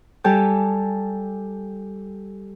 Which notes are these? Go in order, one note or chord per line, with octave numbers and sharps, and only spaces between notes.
G3 G4 A4 G#5 A5 G6